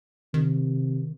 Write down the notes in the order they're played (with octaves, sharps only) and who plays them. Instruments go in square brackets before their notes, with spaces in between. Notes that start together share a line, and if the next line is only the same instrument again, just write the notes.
[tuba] C3 [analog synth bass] D#3